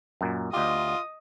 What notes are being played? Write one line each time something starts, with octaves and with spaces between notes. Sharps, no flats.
F#2 A#2
D2 F4 G4 D#5 D#6